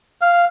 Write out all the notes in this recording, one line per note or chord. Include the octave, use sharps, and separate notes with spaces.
F5